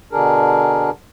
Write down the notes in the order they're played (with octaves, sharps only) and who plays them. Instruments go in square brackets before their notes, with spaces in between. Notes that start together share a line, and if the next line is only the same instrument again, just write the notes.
[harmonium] B2 D3 D4 G#4 A#4